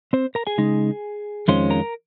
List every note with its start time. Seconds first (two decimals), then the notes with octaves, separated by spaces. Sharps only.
0.13 C4 C5
0.35 A#4 A#5
0.47 G#4 G#5
0.58 C#3 G#3 D#4
1.48 F2 D#3 G#3 C#4 F4 C5 C6
1.70 A#4 A#5